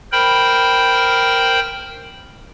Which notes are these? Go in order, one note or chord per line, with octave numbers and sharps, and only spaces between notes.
A#4 C5 G5 B5